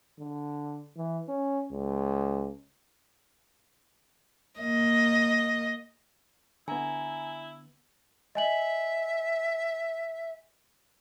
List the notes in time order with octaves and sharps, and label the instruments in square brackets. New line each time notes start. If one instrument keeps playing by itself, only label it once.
[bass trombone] D3
E3
C#4
C#2
[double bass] A#3 [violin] D#5
[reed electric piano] D3 B3 [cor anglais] E4 [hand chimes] G#5 A#5
[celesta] D#5 G#5 F#7 [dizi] E5